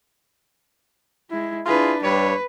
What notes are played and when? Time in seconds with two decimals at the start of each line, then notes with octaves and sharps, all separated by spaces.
1.30 G#3 E4
1.66 D4 E4 F4 G#4 B4
2.02 G2 G3 B4 C#5